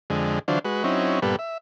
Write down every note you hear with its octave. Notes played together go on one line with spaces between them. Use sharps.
F2 D3 G#3
D3 E3 F#3 D4 F4 C5
G#3 F#4 B4
F#3 C4 C#4 D#4 E4
G2 A#2 G3 B3 A4 B4
E5